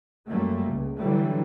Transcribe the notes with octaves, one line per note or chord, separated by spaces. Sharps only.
F#2 F#3 G3 A3 A#3
C#2 C#3
D3 E3 F#3 G3 A3